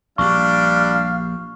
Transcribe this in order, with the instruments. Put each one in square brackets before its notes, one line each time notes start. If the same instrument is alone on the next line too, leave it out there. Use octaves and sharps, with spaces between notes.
[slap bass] A#1 [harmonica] G3 D4 [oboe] F5 [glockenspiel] C#6